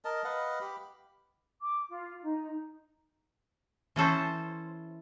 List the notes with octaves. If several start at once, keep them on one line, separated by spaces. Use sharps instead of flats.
A#4 D#5 A5
B4 D#5 F5 F#5
G4 B5
D6
F4
D#4
E3 C#4 A4 C5